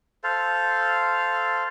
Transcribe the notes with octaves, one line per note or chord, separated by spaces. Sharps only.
A4 C5 F5